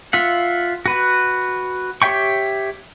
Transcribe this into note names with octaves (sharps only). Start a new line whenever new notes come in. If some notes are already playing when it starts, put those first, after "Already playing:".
F4 E5 F#5
F#4 B4
G4 C#5 E5 G5 C#6